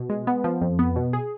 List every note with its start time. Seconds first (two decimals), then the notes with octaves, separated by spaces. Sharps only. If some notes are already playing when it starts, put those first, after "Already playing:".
Already playing: B2
0.10 G#3
0.27 B3
0.44 F3
0.61 F2
0.79 B3
0.96 B2
1.13 G#4